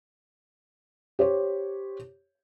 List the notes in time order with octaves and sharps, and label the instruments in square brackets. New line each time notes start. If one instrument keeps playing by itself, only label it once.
[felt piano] G4 C5 C#5